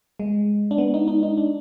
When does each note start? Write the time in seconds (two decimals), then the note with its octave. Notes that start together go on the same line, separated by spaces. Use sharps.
0.20 G#3
0.71 D4
0.78 B3
0.94 D#4
1.08 D#4
1.23 D#4
1.38 D4